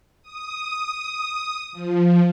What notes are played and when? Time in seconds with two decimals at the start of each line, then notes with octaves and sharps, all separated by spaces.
0.22 D#6
1.72 F3